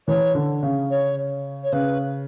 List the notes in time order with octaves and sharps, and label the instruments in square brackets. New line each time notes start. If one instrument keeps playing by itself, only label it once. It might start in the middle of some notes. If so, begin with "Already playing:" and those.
[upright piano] E3 [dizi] C#5
[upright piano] D3
C#3
[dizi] C#5
C#5
[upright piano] C#3 [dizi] B4